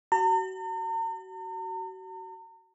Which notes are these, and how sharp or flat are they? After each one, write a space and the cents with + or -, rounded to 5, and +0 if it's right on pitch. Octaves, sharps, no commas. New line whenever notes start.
F#4 +30 A#5 -45